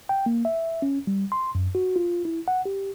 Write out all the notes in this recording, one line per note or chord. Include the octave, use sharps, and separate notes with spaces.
G5
A#3
E5
C#4
G3
C6
F#2
F#4
F4
E4
F#5
G4